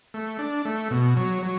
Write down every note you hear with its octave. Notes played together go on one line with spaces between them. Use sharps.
A3
D4
A3
B2
F#3
F#3